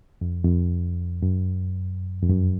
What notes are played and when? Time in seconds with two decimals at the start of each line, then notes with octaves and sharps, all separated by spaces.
0.21 F2
0.44 F2
1.22 F#2
2.22 F2
2.30 F#2